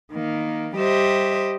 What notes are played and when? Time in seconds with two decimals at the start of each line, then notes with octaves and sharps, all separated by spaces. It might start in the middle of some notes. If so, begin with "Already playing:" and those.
0.14 D#3 A#3
0.76 G3 G4 C5 D#5 E5